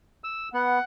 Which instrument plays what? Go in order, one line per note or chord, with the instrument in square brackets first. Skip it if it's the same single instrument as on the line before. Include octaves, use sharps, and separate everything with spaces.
[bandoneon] E6
[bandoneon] B3 [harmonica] F#5